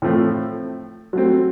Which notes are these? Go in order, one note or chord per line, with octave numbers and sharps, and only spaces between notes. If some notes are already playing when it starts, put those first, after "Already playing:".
A2 F3 A3 C4
F#3 A3 C4